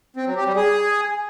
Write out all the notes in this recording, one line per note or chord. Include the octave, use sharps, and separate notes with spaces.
C4
F#3
G4
G3
G#4